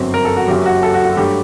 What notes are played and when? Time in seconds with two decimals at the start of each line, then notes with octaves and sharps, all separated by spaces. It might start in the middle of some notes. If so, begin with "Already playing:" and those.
Already playing: G1 F#2 F#3 C4
0.14 A#4
0.25 A4
0.37 F#4
0.47 F#1 F#2 F#3 G4
0.66 F#4
0.83 A4
0.94 F#4
1.05 F#4
1.17 G2 F#3 A3 G4